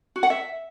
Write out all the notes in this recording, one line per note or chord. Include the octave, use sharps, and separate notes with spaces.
F#4
F#5
E5